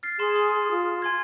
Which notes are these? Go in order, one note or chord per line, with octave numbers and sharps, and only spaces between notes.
F6 A6 C7
G#4 C6 E7
C6 F6
F4
G#5 C6 G#6